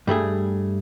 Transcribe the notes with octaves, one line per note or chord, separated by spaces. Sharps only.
G2 G3 A3 G#4